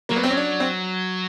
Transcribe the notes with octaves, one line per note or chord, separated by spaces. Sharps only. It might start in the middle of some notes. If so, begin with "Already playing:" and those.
F#3 A#3
B3
C4
C#4
D4
C4